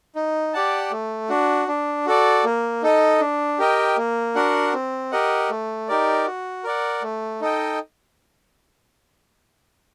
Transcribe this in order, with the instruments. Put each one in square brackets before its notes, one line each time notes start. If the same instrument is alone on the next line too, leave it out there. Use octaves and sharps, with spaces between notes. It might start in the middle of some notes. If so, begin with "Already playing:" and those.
[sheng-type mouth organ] D#4
G4 D5 F#5 A5
A3
D4 F#4
D4
F#4 A4 D5
A#3
D#4 A4 D#5
D4
G4 A#4 D#5 G5
A#3
D4 F#4 A#4 F#5
C4
G4 A#4 D#5 F#5
A3
D#4 G4 A#4 D5
F#4
A#4 D5 F#5
A3
D#4 A4 D#5 G5